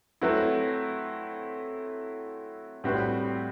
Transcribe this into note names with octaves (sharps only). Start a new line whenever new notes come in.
F#3 A3 C4 E4 B4
A2 G3 C4 F#4 B4